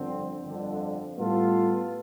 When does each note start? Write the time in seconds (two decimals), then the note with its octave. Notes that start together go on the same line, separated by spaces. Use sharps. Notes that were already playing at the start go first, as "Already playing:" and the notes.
Already playing: G1 F2 D3 F3 C4
0.44 G1 F2 D3
1.17 A2 G3 B3 F4 A4